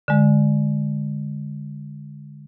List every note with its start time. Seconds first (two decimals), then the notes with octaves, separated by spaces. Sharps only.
0.08 D3 G#3